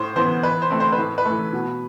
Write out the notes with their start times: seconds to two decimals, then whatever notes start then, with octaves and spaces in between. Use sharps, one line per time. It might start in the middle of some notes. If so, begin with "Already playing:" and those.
Already playing: A2 C5
0.16 E3 B3 C5
0.43 E3 B4
0.62 C5
0.70 A3 C4
0.80 C5
0.92 B4
0.98 A2
1.18 B4
1.25 E3 A3
1.53 B2